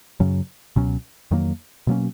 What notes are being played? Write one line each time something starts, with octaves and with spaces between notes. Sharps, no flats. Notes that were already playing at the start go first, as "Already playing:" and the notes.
F#2 C#3 F#3 C#4
C#2 B2 F#3 C#4
F2 D#3 F#3 A#3
B2 F#3 A#3 C#4